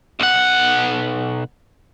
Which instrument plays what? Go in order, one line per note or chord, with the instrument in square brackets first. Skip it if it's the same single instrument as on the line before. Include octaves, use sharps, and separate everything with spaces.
[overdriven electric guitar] B1 F#5